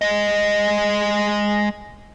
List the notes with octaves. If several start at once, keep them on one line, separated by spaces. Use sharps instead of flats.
G#3 D#5